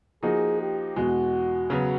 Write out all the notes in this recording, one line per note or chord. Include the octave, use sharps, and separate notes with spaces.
F3 A#3 D#4 F#4 G#4
G4
E2 B2 G#3 F#4
C#3 F#3 B3